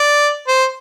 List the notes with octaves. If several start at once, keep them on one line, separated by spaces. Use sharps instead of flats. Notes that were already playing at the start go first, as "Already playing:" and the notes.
Already playing: D5
C5